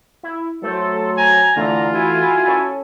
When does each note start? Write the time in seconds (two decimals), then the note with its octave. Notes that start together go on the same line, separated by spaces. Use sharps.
0.23 E4
0.63 F#3 A3 A4 C5
1.17 G#5 A#5
1.57 D3 E3 A3 F4
1.94 E4 F#4 G#5
2.47 C#4 A4